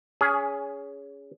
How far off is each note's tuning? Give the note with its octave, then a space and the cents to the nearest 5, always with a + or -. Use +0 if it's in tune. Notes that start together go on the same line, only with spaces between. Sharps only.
C#4 +25 G#4 +0